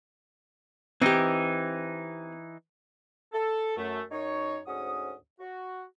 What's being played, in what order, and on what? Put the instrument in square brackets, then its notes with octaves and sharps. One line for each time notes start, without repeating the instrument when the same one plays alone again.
[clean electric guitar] E3 D#4 [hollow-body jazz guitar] C4 G4
[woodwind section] A4
F#2 A3
F#2 D#4 C#5
D2 G#2 C#4 F#4 D#6
F#4